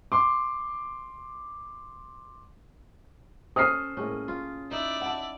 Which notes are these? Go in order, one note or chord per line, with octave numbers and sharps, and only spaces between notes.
C6 D6
C#4 A4 C5 D#6 F6 C7
A2 G#3 A#3 C#4
F4
D#4 E4 D5
F#5 A5